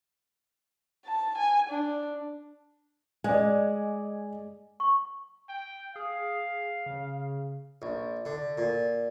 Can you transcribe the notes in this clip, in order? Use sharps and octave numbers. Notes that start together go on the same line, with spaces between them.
A5
G#5
D4
G#3 D5 D#5 G#5
C#6
G5
G#4 F5
C#3
A#1
D3
A#2